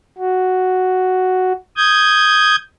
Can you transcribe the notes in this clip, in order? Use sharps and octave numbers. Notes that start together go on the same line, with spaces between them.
F#4
D#6 G6 G#6